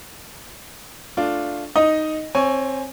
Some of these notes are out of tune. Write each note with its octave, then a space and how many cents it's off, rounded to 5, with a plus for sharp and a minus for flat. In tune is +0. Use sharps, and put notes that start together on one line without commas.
A3 +0 D4 +0 F4 +0
D#4 +0 D#5 +0
C4 +20 C#5 +0 G#5 +0